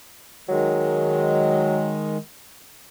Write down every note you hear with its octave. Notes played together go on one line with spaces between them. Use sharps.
D#3 F#3 G#3